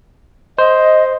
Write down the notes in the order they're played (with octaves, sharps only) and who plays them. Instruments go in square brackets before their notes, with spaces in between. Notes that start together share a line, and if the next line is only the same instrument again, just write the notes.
[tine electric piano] C5 [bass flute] D#5